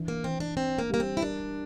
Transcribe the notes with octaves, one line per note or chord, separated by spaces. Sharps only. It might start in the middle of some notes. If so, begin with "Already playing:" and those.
Already playing: E3 D4
A#3
E3 C4
D4
C4 D4
A#3
G3 A#3
C4
E4
D4 A#4